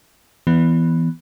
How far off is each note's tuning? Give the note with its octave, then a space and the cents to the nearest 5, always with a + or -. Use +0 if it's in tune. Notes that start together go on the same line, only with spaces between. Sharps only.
E3 +0 B3 +0